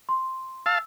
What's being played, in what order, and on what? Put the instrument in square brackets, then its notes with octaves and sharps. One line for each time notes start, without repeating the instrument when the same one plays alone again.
[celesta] C6
[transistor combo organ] F5 A5 [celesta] E6